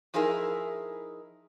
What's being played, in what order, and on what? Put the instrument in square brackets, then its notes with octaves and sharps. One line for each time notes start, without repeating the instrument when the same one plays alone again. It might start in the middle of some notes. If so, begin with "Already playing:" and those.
[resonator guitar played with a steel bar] F3 D#4 E4 G#4 A#4 E5